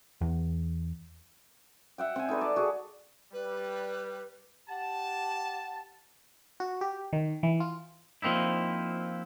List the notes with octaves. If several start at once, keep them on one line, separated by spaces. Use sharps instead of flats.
E2
E5 F#5 G5
C4 G#5
D#4 A4 B4 D5
D5 A5
F#4 G#4
G3 B4
G4 F#5 A5
F#4
G4
D#3
E3
F4
F3 A#3 C4 D#4 E4